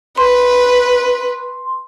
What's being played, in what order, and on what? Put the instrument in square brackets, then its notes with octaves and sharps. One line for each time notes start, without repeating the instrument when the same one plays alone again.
[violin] B4 [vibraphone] C6